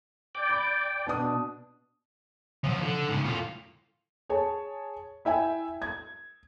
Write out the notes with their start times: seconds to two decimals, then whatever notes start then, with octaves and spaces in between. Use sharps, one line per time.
0.35 D5 G5
0.49 B5
1.06 B2 D4 D#6
2.64 F3 F#3
2.82 D3
3.08 G#2 C#3
3.24 A2 F4
4.29 G#4 C#5 A5
5.25 E4 E5 G5 G#5
5.82 G#6